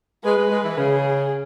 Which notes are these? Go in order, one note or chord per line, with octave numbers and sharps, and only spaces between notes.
G#3 B4
G#3
G#3
E3
C#3 G#4